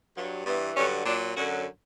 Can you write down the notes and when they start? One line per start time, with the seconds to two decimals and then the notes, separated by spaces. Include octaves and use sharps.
0.16 G2 F#3
0.46 G2 E3 B3
0.76 G2 D3 F#3 C#4
1.06 A#2 F#3 D4
1.36 F#2 D3 F#3 F#4